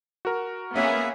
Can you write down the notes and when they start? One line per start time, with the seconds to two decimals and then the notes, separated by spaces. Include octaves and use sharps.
0.25 F#4 A#4
0.76 A#3 B3 C#4 G#4 E5